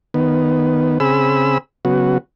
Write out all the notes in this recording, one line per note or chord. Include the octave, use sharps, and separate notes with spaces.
D#3 B3
C#3 C4 G#4 B5 E6
C#3 F#3 B3 F#4